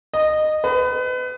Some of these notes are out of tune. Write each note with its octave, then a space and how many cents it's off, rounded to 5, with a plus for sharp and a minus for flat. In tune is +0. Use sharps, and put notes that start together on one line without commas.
D#5 -15
B4 +30